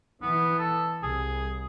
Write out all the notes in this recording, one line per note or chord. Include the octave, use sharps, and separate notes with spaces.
E3 B3
A4
C2 G#4